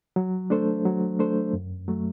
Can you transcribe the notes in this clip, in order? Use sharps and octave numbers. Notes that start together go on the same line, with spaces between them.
F#3
A3 D4 A4 C5
F#3
A3 D4 A4 C5
F#2
F#3 A3